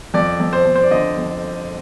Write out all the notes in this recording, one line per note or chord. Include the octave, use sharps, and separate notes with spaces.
F2 D5
F2
C5
F2
C5
D5
D3 D#5
F2